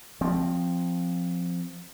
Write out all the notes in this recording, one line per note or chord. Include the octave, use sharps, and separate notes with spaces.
F3 C4